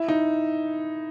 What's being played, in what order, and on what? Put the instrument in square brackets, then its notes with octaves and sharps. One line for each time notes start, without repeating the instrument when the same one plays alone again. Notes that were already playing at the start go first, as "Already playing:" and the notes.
Already playing: [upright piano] E4
D#4